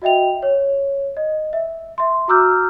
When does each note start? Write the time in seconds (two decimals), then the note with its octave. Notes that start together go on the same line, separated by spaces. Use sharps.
0.02 F#4 D#5 E5 G5 F7
0.42 C#5
1.17 D#5
1.53 E5
1.98 E5 C6
2.28 F#4 A#5 D6 E6 F6 G6